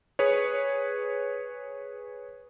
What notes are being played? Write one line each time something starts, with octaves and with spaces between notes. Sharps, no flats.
G#4 B4 C#5